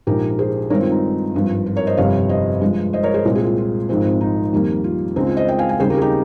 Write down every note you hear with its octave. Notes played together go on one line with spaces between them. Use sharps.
A#1 G#2 F3 G4 A#4
G#4 C5
G2 D#3 G#3 C4 A#4 C#5
F4
D#4
G#1 G2 F3
F4
A#4 C#5
C5 D#5
G1 F2 C3 G3 C4 C#5 F5
C5 D#5
G2 F3 G#3
C5 D#5
A#4 C#5
G#4 C5
C2 A#2 G#3 C4
F4 G#4
F4
F4
G#1 G#2 F3 G#3 C4
D#4
F2 D#3 G3 A#3
F4
C#2 C#3 G#3 C4 D#4
F4
C5 D#5
D#5 G5
F5 G#5
F5 G#5
D#2 C#3 G3 C4 G#4 C5
G4 A#4
G#4
D#4 G4